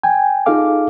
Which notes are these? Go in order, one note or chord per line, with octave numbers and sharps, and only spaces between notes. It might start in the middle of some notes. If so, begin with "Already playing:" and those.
G5 G#5
D#4 F4 G#4 A4 F5 D6